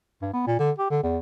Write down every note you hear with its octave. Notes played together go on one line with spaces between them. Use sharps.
G2
B3
A#2
D3
G4
D3
E2